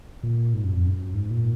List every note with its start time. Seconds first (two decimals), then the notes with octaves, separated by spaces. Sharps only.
0.23 A#2
0.54 G#2
0.64 F#2
0.74 F2
0.85 F#2
1.14 G#2
1.30 A#2